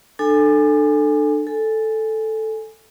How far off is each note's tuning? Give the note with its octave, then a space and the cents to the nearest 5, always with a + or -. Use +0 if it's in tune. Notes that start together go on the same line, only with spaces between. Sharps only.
D4 +35 A4 +0 G#5 -10
A4 +0 G#5 +0